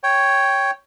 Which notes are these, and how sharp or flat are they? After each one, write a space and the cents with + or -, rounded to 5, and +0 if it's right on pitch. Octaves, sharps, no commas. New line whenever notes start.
C#5 +0 G5 +0